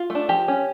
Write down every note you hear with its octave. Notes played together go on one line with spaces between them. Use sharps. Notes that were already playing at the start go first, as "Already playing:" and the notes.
Already playing: F4
A3
D4
F3 G4
C#4